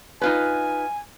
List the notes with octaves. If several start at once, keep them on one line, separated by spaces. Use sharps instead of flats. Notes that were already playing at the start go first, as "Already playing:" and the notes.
D#4 F4 B4 G#5